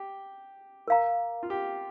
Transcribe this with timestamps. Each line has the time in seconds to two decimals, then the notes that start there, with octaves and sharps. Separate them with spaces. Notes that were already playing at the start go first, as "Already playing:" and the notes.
Already playing: G4
0.88 A#4 F5 A#5
1.43 F4
1.50 G4